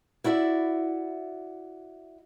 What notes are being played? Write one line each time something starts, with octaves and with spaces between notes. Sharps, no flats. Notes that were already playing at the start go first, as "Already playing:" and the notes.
E4 F#4 D5 E5